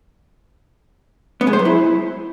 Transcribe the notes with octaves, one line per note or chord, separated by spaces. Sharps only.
B3
G#3
C5
F#3
E4